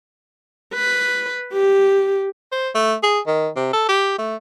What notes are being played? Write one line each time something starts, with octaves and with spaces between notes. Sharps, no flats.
B4
G4
C5
A3
G#4
D#3
C3
A4
G4
A3